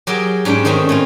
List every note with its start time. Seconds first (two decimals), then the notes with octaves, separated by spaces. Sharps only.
0.07 F#3 G4 G#4 A#4 G5
0.45 G#2 C#4 D4 G5
0.65 D#3 A3 C4 C#4 D#4
0.89 A2 C4 F4